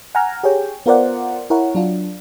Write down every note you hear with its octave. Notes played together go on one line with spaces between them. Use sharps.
F#5 G#5 A#5 F6
G4 G#4 C#5 G5
B3 F4 A#4 C5 D5 F#5
E4 A#4 C#5 F#5
F#3 D4 F4